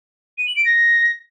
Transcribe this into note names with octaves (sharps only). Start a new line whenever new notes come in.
D#7
F#7
D7
A#6